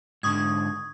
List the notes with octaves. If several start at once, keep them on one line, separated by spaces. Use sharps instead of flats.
G#2 D3 C#6 D#6 G#6